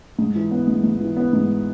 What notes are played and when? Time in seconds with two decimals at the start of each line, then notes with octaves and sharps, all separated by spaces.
0.19 G#2
0.35 E3
0.51 B3
0.68 G#2
0.84 G#2
1.00 E3
1.17 B3
1.33 G#2